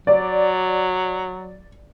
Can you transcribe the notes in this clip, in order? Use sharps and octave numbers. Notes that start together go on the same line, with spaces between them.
F#3 D5